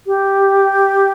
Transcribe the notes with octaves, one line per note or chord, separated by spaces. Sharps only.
G4